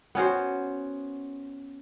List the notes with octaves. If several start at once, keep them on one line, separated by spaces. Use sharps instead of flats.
B3 C#4 F#4 C5